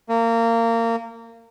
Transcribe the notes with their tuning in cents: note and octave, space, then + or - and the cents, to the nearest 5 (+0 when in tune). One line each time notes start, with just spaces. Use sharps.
A#3 -25